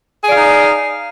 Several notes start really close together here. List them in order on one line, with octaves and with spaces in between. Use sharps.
G#4 D5 F5 D#4